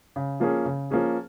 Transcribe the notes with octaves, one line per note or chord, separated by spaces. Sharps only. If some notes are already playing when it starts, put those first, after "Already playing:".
C#3
F3 A#3 C#4 G#4
C#3
F3 A#3 C#4 G#4